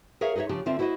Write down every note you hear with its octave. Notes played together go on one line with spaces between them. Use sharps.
G#4 A#4 C#5 E5 F5
D#4 G#4 B4 C#5 E5
C#3 F3 D4 G4
D3 C4 F4 E5
E4 F#4 C5 C#5 D#5